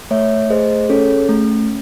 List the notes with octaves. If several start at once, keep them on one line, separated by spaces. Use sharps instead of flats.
A3 C#5 E5
G#4 C5 D#5
C#4 A4 C#5
A3